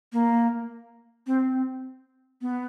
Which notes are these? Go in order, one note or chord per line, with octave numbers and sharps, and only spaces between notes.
A#3
C4
B3